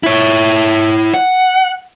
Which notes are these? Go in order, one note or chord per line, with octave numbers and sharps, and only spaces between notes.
E4 C#5
F#5